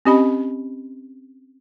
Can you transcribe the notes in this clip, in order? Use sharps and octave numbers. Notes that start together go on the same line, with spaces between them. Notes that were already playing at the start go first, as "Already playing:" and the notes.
C4 C#4 G4 D#5 B5